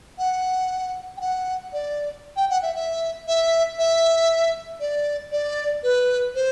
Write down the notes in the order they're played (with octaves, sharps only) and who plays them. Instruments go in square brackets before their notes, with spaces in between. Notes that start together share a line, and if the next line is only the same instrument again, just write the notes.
[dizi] F#5
G5
F#5
D5
G5
F#5
E5
E5
E5
E5
D5
D5
B4
C5